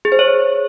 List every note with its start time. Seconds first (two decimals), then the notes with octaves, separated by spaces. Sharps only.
0.05 G#4
0.12 C5
0.19 C#5